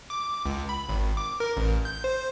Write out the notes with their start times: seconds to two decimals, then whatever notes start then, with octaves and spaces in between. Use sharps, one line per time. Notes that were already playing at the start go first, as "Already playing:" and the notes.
0.10 D6
0.46 C#2
0.69 B5
0.89 G#1
1.17 D6
1.40 A#4
1.57 A1
1.85 G6
2.04 C5